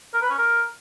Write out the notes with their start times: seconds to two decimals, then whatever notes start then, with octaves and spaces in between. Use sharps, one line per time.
0.13 A#4
0.22 B4
0.30 C#4
0.38 A#4